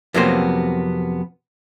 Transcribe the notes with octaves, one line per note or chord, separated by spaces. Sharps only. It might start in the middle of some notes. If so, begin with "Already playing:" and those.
F2 C3 F#3 A#3 B3 C5